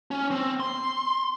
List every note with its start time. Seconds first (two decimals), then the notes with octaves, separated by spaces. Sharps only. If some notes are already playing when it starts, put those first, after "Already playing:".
0.11 C#4
0.31 C4
0.60 C6